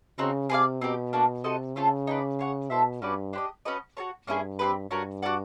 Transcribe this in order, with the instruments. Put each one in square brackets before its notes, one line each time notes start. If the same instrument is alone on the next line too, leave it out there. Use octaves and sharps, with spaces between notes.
[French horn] C#3 [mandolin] C4 D#4 F#4
[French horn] C3 [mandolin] G#4 B4 D5 F5
[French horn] B2 [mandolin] C4 D#4 G4
[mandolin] A#3 D4 F#4
[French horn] C3 [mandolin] F#4 A4 C5 D#5
[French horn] C#3 [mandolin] A3 C4 F4 A4
[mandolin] D#4 G#4 B4 D5
G#4 C#5 F#5
[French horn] B2 [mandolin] E4 A4 C5 E5
[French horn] G2 [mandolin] C#4 F#4 B4 D5
[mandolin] D4 G4 C5 D#5
C#4 F#4 B4 D#5
F#4 A4 C#5
[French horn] G2 [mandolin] A#3 C#4 E4 G#4
[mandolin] C4 D#4 G4 B4
[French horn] G2 [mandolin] C#4 F#4 A#4
[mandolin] F#4 B4 D5 F#5